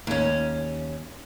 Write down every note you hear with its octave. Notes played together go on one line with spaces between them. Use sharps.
D#2 C#4